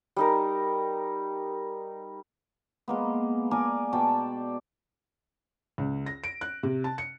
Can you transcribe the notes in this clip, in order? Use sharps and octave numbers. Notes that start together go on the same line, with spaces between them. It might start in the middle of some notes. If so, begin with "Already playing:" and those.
G3 D#4 A#4
G#3 A#3 B3
G#4 A#4 D5 G#5
B2 D5 G5 A5
C#2
A#6
D7
F#6
C3
A5
C#7